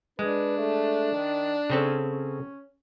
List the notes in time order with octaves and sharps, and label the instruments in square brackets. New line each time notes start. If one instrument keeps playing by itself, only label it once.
[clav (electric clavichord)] G#3 [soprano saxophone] D4 [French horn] B4
[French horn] A3
D#3
[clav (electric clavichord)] C#3 C4 A4 [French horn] C#4
[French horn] C#4